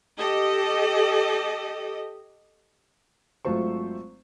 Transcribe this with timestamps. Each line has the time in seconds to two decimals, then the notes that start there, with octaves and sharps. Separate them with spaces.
0.18 G4 A4 D#5
3.45 G#1 F#3 A3 F4 C5 C#6